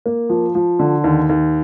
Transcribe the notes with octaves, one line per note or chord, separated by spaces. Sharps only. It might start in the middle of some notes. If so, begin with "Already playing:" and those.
A#3
F3
F3
D3
D#2
D#2